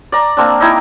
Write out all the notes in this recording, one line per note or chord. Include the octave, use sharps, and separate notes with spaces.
D5 A#5
A#3 C4 D4
D#4 E4 G5 G#5